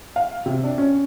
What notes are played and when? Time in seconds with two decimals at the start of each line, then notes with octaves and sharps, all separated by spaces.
0.16 F5
0.46 C3
0.63 D4
0.78 C#4